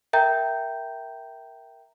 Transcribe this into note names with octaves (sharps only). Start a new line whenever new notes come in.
A#4 E5 G5 A#5 G6